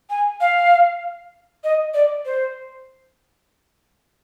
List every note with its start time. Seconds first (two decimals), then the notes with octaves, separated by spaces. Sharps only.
0.10 G#5
0.41 F5
1.64 D#5
1.94 D5
2.25 C5